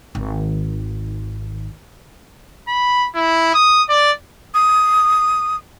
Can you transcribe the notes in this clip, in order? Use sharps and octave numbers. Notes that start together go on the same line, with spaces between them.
G#1 D#3
B5
E4
D#6
D5
D#6